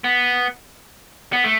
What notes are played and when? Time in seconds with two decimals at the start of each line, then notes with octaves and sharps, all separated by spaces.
0.04 B3
1.33 B3
1.44 A3